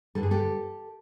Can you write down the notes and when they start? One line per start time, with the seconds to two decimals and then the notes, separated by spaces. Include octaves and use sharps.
0.15 G2 D3 G3 A4
0.23 G#4
0.31 G4 A4